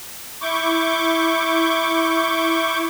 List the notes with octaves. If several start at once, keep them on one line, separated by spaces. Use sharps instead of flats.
E4 C#6 D6 G6